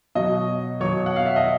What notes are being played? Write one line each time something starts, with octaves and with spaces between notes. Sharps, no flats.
B2 F#3 D#5
B2 F#3 C#5
F#5
F5
E5
D#5